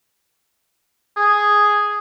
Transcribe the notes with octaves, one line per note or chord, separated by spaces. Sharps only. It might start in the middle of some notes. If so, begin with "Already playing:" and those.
G#4